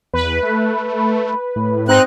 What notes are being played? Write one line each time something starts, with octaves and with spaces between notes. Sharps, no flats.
E2 B4
A3
A2
G#2 C4 D#4 F#6